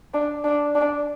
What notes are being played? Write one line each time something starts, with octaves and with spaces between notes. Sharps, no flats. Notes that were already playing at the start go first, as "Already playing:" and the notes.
D4
D4
D4